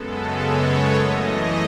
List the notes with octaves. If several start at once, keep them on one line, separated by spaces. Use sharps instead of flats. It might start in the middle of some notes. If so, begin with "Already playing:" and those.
Already playing: F#2 C#3 G#3 B3 A4
C#5
F#2 E3 A3 D#5